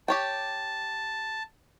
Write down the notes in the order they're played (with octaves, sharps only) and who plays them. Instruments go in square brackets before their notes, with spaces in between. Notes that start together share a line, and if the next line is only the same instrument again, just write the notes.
[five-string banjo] G4 C#5 G5 [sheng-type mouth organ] A5